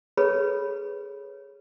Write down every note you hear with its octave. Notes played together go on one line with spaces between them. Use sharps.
G#4 A4 B4 C#5 B5